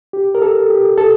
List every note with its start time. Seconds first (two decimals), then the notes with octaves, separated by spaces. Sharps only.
0.13 G4
0.35 A#4
0.42 A4
0.70 G4
0.98 A4